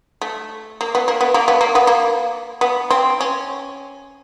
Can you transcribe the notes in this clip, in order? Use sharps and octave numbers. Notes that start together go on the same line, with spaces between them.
A3
A#3
B3
A#3
B3
A#3
B3
A#3
B3
A#3
B3
C4
C#4